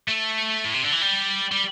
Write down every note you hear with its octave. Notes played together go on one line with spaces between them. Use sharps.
A3
A2
C3
D3
E3
G3
G3